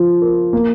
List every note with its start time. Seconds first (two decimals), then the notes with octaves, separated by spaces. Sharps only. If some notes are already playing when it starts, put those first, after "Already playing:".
Already playing: F3 F4
0.22 A#4
0.53 A#3